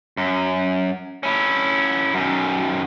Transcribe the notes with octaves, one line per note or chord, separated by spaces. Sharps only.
F#2
C#4 E4
F#2 D#3